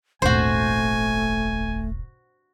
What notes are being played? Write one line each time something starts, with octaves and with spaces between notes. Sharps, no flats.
D#1 G#1 A3 F#4 C5 G#5